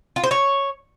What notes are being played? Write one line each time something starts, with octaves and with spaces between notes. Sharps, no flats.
F4
C5
C#5